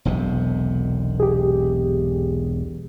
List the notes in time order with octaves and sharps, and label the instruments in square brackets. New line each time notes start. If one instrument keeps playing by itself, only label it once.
[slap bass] E1 B1 C3
[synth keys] G4 G#4